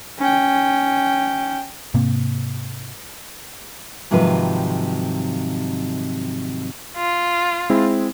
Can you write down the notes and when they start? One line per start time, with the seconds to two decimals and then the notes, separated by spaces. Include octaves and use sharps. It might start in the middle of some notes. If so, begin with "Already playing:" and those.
0.18 C#4 G5
1.94 G#2 C3 A#3 C4
4.11 G#2 C3 D#3 F3 F#3 B4
6.97 F4
7.70 G#3 C4 E4